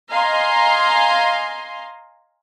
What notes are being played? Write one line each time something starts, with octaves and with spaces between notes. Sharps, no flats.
D#5 F5 G#5 A#5 C6